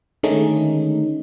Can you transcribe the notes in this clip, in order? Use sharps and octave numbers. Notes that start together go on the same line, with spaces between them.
D3 D#3 G#3 A3 C#4 D#4